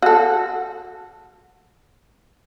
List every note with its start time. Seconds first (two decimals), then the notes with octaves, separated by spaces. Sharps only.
0.02 F#4 A4